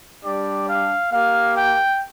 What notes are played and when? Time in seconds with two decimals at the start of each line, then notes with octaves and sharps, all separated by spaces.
0.24 G3 D4 G4 D5
0.67 F5
1.12 A#3 G4 F5
1.56 G5